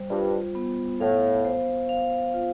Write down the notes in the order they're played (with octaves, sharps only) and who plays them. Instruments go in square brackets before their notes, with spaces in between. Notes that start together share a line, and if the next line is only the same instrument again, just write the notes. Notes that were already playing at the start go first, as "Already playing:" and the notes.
Already playing: [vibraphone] G3 C5
[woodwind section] G2 [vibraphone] F4
[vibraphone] B3
[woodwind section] A2 [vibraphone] F5
[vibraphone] C5
F5
F4